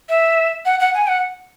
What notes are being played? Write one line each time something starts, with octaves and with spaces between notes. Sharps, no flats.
E5
F#5
F#5
G#5
F#5